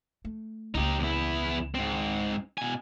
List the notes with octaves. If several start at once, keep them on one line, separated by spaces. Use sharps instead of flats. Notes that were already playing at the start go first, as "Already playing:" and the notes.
A3
C#2 A#3 D#4 G4
E2 E4
G#2 C4
B2 G#5